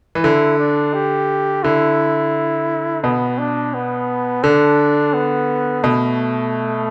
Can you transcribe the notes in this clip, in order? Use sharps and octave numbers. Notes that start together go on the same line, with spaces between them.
E3
D3 E4
D4
G4
D3 E4
B2 B3
D4
B3
D3 D4
B3
B2 A3